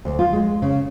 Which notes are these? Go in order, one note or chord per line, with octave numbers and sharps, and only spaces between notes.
D2
F4
G#3
C#3